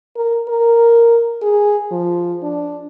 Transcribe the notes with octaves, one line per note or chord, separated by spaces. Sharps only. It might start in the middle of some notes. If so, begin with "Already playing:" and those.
A#4
A#4
G#4
F3
D4